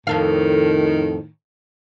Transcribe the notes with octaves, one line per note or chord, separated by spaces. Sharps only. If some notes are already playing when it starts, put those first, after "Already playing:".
F2 A2 D#3 A4 F5